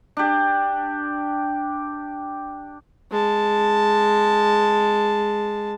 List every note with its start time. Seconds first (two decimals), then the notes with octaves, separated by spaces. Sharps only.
0.17 D4 G4
3.11 G#3 A5